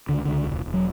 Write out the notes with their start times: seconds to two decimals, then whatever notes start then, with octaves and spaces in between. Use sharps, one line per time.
0.09 C#2 D3
0.25 C#2 D3
0.47 E1
0.66 E1
0.74 F#3